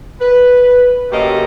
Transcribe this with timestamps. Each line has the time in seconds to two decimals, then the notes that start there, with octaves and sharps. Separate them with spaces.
0.20 B4
1.12 F#2 C#3 A3 A#3 G4 D#5